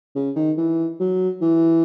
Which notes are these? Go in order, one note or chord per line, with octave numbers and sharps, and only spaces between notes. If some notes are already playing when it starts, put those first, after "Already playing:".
C#3
D#3
E3
F#3
E3